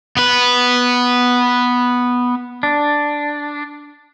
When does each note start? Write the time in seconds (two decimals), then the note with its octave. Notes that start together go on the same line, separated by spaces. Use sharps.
0.17 B3 B4
2.63 D4